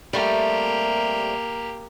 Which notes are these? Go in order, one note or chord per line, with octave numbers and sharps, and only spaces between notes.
G3 A3 A#3 C4 G4